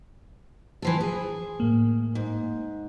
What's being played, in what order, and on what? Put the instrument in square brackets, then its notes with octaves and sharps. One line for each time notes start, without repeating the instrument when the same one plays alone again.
[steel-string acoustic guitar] E3 F3 A4
G#4
[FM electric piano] A2 A#3
[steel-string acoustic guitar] G#2